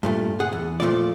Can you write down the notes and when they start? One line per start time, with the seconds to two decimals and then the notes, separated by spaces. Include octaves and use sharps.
0.03 G2 A#2 A3
0.40 G#4 F#5
0.52 E2
0.80 A#2 F3 G#3 A3 F4 D5